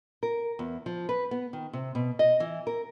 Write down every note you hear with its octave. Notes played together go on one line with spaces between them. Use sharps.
A#4
E2
F3
B4
B3
D#3
C3
B2
D#5
E3
A#4